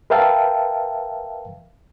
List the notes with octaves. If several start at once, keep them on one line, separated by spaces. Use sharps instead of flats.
A#4 B4 E5 F5 G5 A5